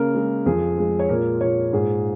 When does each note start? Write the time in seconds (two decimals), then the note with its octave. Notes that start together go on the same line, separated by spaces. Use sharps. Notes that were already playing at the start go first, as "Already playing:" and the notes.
Already playing: C#3 A#3 A#4
0.15 G#3
0.46 F2 G#4
0.78 G#3
0.99 C#5
1.09 A#2 A#4
1.41 A#2 C#5
1.73 G#2 G#4